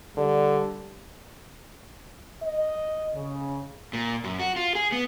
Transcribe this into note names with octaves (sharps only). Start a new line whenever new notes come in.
D3 G3
D#5
C#3
A#2
F#2
F#4
F4
G#4
B3